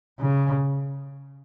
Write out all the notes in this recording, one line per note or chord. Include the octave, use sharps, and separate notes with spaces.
C#3